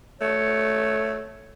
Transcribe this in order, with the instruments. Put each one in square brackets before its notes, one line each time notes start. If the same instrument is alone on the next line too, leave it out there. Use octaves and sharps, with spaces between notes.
[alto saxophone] A3 [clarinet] C#5